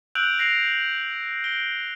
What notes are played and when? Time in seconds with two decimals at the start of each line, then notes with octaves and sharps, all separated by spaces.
0.15 E6 F#6 G6 D7 F7 F#7
0.39 A#6 C7 D7 F7
1.44 D7 G7